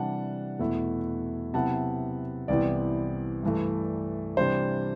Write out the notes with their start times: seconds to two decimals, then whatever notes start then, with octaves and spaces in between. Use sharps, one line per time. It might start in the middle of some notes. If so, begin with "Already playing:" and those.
Already playing: C3 E3 G3 D4 F#5 A5
0.59 E2 B2 A3 E4
1.54 C3 F#3 B3 E4 F#5 A5
2.48 C2 C3 E3 B3 E4 D5
3.43 G2 E3 A3
4.37 C3 E3 G3 D4 C5